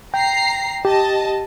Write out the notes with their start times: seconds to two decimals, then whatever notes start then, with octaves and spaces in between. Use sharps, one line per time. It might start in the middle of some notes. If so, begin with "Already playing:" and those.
0.14 G5 A#5 C7
0.85 G4 D#5 A5